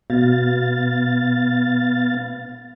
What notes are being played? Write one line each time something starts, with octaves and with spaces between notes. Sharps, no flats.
B2 B3 F5 A6